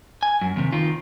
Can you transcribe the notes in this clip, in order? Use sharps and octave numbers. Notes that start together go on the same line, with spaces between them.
G#5
F#2
D#2 C3
D#3 F4